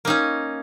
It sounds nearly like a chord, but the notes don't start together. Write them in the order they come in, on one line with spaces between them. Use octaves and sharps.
A#3 D#4 C#4